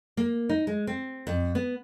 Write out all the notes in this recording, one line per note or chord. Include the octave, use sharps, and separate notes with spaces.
A#3
D#4
G#3
C4
F2
B3